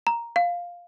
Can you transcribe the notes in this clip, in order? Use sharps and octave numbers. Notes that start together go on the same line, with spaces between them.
A#5
F5